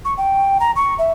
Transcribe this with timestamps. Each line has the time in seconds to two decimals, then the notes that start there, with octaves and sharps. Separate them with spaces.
0.05 C#6
0.18 G5
0.60 A#5
0.76 C#6
0.99 E5